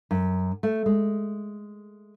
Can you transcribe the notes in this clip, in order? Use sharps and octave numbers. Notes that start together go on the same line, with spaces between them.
F#2
A3
G#3